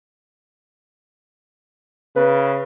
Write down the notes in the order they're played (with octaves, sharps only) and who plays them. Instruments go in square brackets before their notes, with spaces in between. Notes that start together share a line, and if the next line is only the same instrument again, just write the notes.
[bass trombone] C#3 [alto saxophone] B4